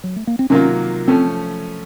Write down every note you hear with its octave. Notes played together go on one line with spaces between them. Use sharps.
F#3
A3
A#3
C4
C3 D#3 F#3 A#3 C#4 F4
F3 A3 C4 C#4 A4